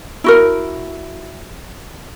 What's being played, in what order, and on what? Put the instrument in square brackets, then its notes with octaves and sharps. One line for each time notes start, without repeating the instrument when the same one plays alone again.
[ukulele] E4 F#4 A#4